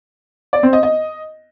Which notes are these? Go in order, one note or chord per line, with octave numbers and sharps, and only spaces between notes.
D5
C4
D#5
D#5